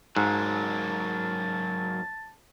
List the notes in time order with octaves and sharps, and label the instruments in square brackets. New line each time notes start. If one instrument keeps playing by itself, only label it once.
[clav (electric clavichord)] G#2 [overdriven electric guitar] F#3 A#3 [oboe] A5